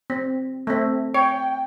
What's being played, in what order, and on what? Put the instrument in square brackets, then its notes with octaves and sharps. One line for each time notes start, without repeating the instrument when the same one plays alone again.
[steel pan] C4
A3 C4
[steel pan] C#5 [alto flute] G5